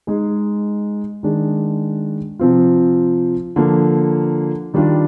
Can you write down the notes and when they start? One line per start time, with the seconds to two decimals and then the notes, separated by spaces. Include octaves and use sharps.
0.07 G#3 D#4 G#4
1.23 D#3 G#3 D4 G#4
2.39 C3 F3 C4 F4
3.56 D3 F3 A#3
4.74 D#3 G3 D4 F4